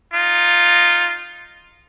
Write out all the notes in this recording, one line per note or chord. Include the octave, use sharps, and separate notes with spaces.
D#4 F4